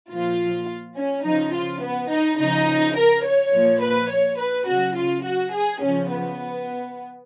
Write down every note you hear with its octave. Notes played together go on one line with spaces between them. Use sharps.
A#2 F3 F4
C#4
C#3 F3 D#4
F4
B3
D#4
C#3 F3 D#4
A#4
C#5
A#2 F3
B4
C#5
B4
C#3 F#3 F#4
F4
F#4
G#4
C#3 F3 C#4
B3